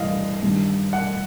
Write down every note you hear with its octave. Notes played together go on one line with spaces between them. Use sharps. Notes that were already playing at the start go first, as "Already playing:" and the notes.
Already playing: G2 E3 D#5 F5
G2 D#3
F#5